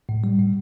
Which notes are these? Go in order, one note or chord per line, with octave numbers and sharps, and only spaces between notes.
A2
G3
A2